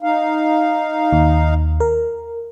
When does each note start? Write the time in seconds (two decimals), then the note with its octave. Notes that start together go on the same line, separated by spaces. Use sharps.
0.02 D#4 F5
1.13 D#2
1.80 A#4